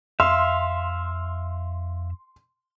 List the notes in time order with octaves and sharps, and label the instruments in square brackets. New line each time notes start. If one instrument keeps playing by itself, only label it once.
[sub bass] F2 [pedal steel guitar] E5 F5 [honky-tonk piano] C6